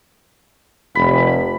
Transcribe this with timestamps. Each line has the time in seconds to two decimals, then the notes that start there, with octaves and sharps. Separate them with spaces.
0.95 F1 B5